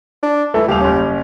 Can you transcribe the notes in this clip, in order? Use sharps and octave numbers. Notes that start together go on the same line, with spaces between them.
D4
E3 A3
D#1 G4 F5 F7
F#1 C#4